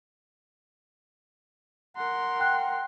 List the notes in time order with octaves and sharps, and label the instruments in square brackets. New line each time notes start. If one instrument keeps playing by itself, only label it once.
[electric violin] A#4 C6 [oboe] F#5
[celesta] G5 F#6